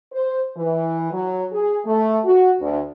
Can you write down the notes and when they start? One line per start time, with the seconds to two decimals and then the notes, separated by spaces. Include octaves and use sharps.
0.12 C5
0.57 E3
1.12 F#3
1.52 G#4
1.86 A3
2.25 F#4
2.61 D2